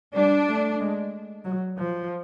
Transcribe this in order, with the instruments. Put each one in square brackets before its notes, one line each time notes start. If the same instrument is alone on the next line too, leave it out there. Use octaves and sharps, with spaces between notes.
[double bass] G3 [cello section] D4
[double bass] A3
G#3
F#3
F3